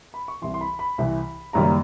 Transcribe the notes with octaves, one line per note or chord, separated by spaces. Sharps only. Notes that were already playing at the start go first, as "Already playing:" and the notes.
B5
C#6
C2 C3 E3 C6
C6
B5
B5
C2 C3 E3
F#1 F#2 D#3 G3 A#3 A#5